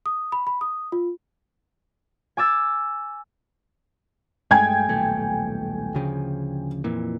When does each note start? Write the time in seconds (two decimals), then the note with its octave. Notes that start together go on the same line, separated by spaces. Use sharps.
0.06 D#6
0.32 B5
0.47 B5
0.61 D#6
0.92 F4
2.37 G#5 D6 E6 A6
4.51 G2 G#3 A3 G5 G#5 G#6
4.89 D#1 B1 A3
5.95 D2 C#3 F3
6.84 F2 A#2 E3